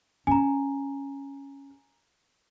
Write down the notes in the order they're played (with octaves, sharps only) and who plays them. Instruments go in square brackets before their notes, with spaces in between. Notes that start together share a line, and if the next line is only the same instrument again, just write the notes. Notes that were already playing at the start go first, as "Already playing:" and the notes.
[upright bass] C#4 [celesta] G#5 A#5